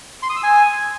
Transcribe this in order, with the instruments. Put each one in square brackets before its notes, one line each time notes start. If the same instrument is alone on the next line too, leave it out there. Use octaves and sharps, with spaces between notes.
[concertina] C6
D#6
E6
G#5